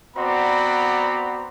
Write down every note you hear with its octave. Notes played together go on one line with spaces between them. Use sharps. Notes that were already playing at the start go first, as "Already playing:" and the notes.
B3 C4 F#4 D5 A#5 B5